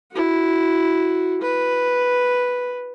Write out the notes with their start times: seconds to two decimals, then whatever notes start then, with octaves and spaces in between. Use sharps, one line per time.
0.11 E4 F#4
1.41 B4